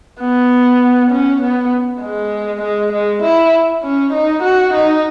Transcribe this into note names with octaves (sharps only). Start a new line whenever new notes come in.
B3
C#4
B3
G#3
G#3
G#3
E4
C#4
D#4
F#4
D#4